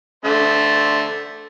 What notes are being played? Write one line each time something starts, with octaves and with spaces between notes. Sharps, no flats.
D3 A3 C5